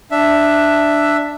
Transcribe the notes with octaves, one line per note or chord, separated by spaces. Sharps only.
D4 E5